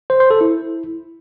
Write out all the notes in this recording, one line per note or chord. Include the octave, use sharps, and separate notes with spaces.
C5
C5
A4
E4